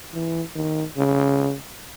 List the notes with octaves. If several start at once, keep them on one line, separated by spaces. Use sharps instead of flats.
E3
D#3
C#3